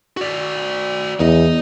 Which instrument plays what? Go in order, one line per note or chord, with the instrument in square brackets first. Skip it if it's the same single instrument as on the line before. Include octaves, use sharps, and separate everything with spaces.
[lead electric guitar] F#4 D5
[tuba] E2 [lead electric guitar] D#4 D#5